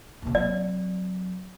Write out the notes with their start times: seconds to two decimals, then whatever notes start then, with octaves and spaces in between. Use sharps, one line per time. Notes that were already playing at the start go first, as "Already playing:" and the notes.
0.22 D#2 C3
0.35 F#3 C4 D5